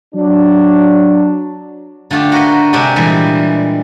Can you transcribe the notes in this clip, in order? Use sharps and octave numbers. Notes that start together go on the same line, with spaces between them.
F#3 D4
D3 A3 F4 G4
F#4 A#4 B4 C6
C3 G#3 C4 D4 G4
A#2 E3 G3 G#3